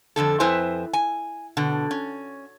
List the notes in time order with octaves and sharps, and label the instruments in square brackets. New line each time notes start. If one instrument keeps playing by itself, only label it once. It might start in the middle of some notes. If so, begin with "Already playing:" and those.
[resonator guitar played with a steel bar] F2 G#2 D3 A4
F2 E4 B4 C5 G#5
G#5
B2 D3
C#4